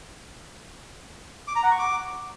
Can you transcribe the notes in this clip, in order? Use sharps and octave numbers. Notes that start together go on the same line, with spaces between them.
D6
A#5
F#5
C#6
D6